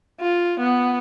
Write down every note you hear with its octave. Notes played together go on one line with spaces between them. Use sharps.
F4
B3